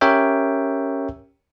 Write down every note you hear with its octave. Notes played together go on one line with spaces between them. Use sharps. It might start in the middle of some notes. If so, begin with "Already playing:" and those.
C#4 G4 A#4 C#5 E5 G5